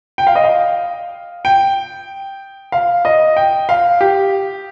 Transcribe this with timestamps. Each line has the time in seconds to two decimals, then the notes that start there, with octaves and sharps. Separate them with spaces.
0.18 G5
0.27 F5
0.35 D#5
0.44 F5
1.45 G5
2.72 F5
3.05 D#5
3.37 G5
3.69 F5
4.01 G4